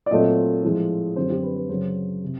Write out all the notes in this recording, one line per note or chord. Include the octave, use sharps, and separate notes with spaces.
D5
A#2 F#3 A3 C4 D#5
A2 F3 G#3
F#2 D3 G3 C4 C5
G4
B4
B4
F#2 C#3 F#3 C5
C3